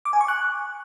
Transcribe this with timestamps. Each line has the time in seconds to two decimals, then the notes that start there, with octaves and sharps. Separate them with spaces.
0.05 D6
0.13 G#5
0.21 C#6
0.28 F#6